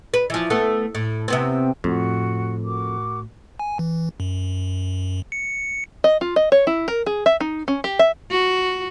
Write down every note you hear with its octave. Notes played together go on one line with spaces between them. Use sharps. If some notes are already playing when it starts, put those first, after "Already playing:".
B4
E3 F3
A3 B3 A4
A2
C3 B3 C4
F2 A2 F#4
F#4 A#4 D6
G#5
E3
F#2
C#7
D#5
F4
D#5
C#5
E4
A#4
G#4
E5
D#4
C#4
G4
E5
F#4